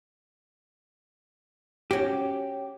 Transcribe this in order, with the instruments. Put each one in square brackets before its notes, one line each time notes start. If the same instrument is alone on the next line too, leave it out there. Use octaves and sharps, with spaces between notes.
[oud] C#4 F#4 [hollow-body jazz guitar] G4